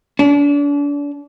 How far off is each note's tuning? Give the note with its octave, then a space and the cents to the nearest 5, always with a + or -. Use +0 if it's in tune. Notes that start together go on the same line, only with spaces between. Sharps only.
D4 -35